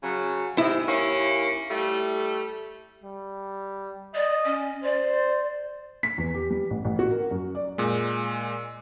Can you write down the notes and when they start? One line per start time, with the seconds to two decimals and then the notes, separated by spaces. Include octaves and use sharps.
0.03 C#3 F#3
0.58 G#2 C3 E4 D#5
0.86 D#2 A#3 C#4
1.71 G3 A3
3.04 G3
4.15 D5 D#5
4.45 C#4
4.84 C5 D5
6.03 B6
6.18 E2
6.34 G4
6.50 G3
6.70 A1
6.85 A1
6.99 F#4
7.11 A#4
7.31 F#2
7.55 D5
7.78 A#2 G#3